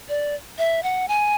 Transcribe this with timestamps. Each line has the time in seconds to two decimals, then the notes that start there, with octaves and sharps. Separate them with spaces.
0.09 D5
0.58 E5
0.83 F#5
1.08 G#5